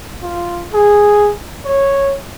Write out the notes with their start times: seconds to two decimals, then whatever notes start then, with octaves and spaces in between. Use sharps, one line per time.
0.23 F4
0.74 G#4
1.65 C#5